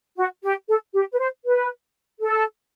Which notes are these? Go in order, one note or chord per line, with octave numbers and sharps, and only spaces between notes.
F#4
G4
A4
G4
B4
C5
B4
A4